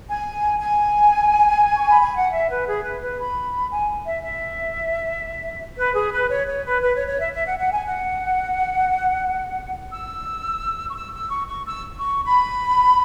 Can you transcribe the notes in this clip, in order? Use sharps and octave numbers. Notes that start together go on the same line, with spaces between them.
G#5
G#5
C#6
B5
G#5
F#5
E5
B4
G#4
B4
B4
B5
G#5
E5
E5
B4
G#4
B4
C#5
C#5
B4
B4
C#5
C#5
E5
E5
F#5
F#5
G#5
F#5
E6
C#6
E6
E6
C#6
C#6
E6
C#6
B5